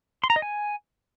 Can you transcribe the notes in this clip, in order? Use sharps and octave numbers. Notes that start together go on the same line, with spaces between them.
C6
A#5
D#5
G#5